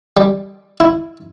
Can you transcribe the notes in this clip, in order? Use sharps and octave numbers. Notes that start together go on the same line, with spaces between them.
G3
E4